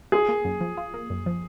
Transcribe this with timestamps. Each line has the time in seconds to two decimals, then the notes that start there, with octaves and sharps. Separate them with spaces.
0.12 F4 G#4
0.29 A#3
0.45 F#2
0.61 F3
0.77 F4
0.94 A#3
1.10 F#2
1.26 F3